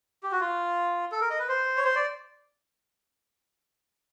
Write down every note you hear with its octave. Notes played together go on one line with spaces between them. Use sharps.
G4
F#4
F4
A4
A#4
D#5
B4
C5
C#5
C5
D5